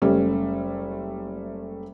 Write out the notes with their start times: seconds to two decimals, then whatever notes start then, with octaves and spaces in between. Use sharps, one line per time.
0.02 F#1 G3 A3 C#4